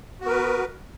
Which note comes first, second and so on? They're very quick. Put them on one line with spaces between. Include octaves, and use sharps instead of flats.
F#4 B3 A#4 B4